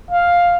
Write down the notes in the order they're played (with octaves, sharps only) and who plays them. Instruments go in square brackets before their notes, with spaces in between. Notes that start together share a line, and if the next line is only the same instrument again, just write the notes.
[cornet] F5